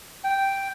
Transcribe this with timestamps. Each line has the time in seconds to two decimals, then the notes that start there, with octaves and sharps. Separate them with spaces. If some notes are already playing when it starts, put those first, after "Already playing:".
0.24 G5